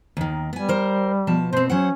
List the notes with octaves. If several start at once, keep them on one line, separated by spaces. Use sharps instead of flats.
D#2 D#3
G3 B3 G#5
A#4 C5
B2 F3 A5
B2 C4 C5
F#3 C#4 C5 F#5